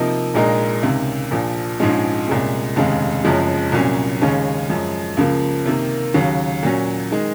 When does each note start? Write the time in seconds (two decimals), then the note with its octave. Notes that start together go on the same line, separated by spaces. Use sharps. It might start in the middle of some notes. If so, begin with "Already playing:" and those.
Already playing: C3 F3 A#3 D#4
0.34 A#1 A#2 G#3 D#4 A#4
0.83 C#2 C3 D#3
1.31 A#1 A#2 F3
1.80 A#1 G#2 F3 G#3 C#4
2.28 C2 A#2 G#3 C#4
2.76 F1 D#2 C#3 G#3
3.24 F#1 F#2 F3 G#3
3.72 C2 A#2 F#3 C#4
4.22 D#2 C#3 G#3 C#4
4.69 F#2 F3 G#3
5.17 C#2 C#3 F3 A#3 F4
5.66 C3 D#3 A#3
6.14 D#2 C#3 F#3
6.63 A#2 F#3 C#4
7.12 D#3 G#3